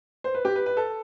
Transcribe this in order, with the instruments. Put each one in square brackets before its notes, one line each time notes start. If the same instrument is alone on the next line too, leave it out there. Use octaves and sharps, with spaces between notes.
[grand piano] C5
B4
G4
B4
B4
A4